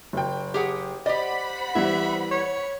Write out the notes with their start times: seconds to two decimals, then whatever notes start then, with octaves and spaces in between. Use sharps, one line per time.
0.13 F#1 G5
0.54 G4 G#4 F#5
1.06 G4 C5 D5 D#5 F#5 B5
1.75 E3 G3 B3 E5
2.31 C#5